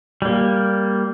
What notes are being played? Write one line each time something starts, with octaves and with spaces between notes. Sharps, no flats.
G3 A#3